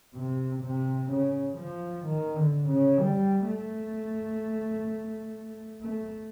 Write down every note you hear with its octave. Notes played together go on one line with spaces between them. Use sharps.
C3
C3
C#3
F3
D#3
D3
C#3
G3
A3
A3